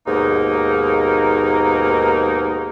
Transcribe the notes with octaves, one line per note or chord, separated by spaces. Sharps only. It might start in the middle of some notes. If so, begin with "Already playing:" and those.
D#2 G#2 B2 A#3 D#4